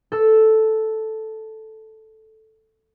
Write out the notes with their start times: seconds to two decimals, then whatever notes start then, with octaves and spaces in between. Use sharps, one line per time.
0.12 A4 E6